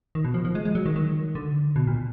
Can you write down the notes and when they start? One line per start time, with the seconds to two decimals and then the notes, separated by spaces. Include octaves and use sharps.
0.15 D#3
0.25 B2
0.34 F3
0.45 F3
0.55 G#3
0.65 G#3
0.75 F#3
0.86 D#3
0.96 D#3
1.35 D3
1.76 B2
1.87 A#2